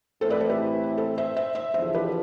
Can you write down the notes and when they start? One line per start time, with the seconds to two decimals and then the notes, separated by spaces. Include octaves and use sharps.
0.21 A2 E3 A3 C4 E4 A4 C5
0.30 B4 D5
0.40 A4 C5
0.50 G4 B4
0.97 A4 C5
1.18 C5 E5
1.36 C5 E5
1.55 C5 E5
1.74 E2 D3 F3 C5 E5
1.95 G4 B4